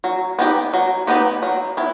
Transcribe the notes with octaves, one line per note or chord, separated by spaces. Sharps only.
F#3
B3 D#4 G4
F#3
B3 D#4 G4
F#3
B3 E4